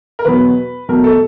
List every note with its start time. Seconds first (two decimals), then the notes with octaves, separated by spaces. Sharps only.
0.19 A#4
0.25 E2 B2 F#3 B4
0.88 E2 B2 F#3 A3 A#4
1.04 A4